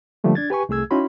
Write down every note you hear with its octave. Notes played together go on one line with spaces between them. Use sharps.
D3 F3 G3 A3 A#3
D4 G#6 A6
G4 B4 G#5 C#6
C2 A3 G#4 E6 G#6
C#4 D#4 E4 F#4 B5 C6